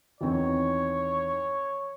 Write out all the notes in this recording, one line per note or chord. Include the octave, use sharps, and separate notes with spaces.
E2 D#3 C4 C#5